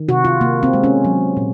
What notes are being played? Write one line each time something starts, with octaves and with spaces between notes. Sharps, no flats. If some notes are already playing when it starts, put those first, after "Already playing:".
Already playing: D#3
C3 F#4
F4
C3 A#3
C4
G#3
C#4
F#3
A#2